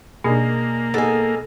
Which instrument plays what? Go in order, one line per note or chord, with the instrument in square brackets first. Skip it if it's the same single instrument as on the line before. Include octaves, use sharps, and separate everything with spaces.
[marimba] B2 [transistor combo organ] A#3 [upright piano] D4 D#4 G#4
[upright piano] B3 D#4 G#4 [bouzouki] A4 G#5